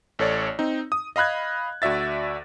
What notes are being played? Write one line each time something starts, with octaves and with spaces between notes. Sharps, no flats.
A1 A4 C#5 D5
C4 D#4
D#6
D#5 F5 B5 F#6 G#6
D2 F#4 D5 E5 A6